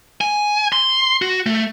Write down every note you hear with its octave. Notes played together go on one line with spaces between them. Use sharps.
G#5
C6
F#4
A3